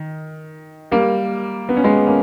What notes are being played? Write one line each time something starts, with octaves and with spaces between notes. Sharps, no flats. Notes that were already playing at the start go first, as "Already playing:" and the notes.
Already playing: D#3
G3 A#3
B3
C#4
G#3 B3
A#3 C#4